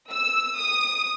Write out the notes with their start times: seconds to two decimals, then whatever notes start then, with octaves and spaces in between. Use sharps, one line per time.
0.12 E6
0.57 D#6